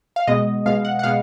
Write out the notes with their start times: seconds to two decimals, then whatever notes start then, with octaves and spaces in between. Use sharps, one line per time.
0.16 F5
0.27 B2 G#3 B3 D#5
0.66 B2 G#3 B3 F5
0.85 F#5
0.99 F#5
1.03 B2 G#3 B3 F5